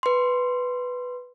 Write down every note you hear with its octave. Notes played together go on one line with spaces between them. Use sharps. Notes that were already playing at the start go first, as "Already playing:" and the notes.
B4 C6